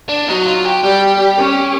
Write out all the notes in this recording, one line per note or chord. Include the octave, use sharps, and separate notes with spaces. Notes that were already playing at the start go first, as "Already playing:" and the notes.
D4
F#3 D#4
F4
G4
G3 G4
C#4